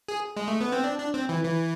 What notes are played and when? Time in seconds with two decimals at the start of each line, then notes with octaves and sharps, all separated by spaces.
0.09 G#4
0.37 G#3
0.48 A3
0.61 B3
0.72 C4
0.84 D4
0.99 D4
1.14 C4
1.29 E3
1.44 E3